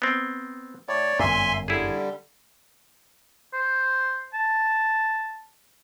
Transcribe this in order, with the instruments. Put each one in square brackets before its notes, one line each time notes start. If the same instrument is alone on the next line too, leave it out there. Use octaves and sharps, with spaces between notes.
[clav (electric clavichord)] B3 C4
[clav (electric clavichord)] A2 [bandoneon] C#5 D5
[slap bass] G1 F#2 [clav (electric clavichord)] A#2 [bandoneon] E5 G#5 C6
[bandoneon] D3 G3 [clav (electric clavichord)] E4 G#4
[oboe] C5
A5